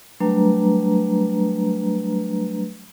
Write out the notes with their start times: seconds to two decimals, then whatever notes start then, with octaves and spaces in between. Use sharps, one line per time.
0.20 F#3 G3 A3 D4 B4 A#5